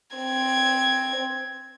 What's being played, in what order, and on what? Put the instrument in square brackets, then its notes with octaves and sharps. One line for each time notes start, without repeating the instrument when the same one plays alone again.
[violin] C4 G#6